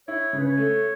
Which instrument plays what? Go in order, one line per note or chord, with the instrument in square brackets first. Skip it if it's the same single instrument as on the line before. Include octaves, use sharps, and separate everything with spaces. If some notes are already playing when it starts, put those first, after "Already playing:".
[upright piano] E4 [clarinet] C#5
[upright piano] C#3
[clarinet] B4
C#5
[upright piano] A3